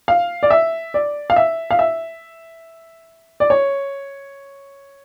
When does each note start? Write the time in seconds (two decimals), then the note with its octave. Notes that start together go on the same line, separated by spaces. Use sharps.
0.08 F5
0.43 D5
0.50 E5
0.94 D5
1.30 F5
1.36 E5
1.71 F5
1.79 E5
3.40 D5
3.50 C#5